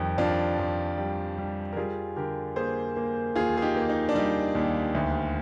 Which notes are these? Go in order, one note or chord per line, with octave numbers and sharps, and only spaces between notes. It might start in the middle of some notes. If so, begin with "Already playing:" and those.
Already playing: F2 D#3 G3
F2 D4 F4
F2
G3
G3
A#4
G3 F4 G#4
D3 G4 A#4
A#3 G#4 C5
A#3
D#2 F4 G#4
G#4
D#4 G4
A#3
D#4
D4
G3 D#4
D#2
D2